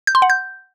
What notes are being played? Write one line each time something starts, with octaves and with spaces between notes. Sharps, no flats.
G6
C6
F#5
G6